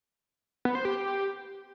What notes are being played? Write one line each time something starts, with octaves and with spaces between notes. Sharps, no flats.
B3
C5
G4